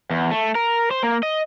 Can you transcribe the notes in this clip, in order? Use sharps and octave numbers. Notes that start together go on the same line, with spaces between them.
E2
A3
A#4
C5
A#3
D#5